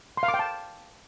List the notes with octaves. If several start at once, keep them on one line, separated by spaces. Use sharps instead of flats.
C6
F5
D6
G5
A5